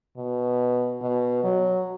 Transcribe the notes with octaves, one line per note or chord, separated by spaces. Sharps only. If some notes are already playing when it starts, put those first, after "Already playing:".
B2
B2
F#3